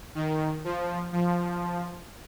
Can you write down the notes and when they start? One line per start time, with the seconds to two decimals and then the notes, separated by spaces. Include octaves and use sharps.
0.15 D#3
0.64 F3
1.13 F3